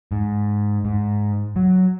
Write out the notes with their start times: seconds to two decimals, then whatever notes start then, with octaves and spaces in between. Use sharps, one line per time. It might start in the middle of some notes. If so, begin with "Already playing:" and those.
0.12 G#2
0.85 G#2
1.56 F#3